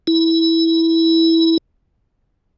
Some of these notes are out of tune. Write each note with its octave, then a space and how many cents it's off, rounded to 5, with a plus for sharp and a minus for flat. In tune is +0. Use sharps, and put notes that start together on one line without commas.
E4 -10